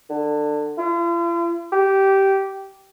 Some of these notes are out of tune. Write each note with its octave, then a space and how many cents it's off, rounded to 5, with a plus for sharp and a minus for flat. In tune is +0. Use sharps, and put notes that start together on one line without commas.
D3 +20
F4 -45
G4 -15